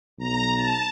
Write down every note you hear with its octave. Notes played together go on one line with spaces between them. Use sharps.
B1 A#5
A5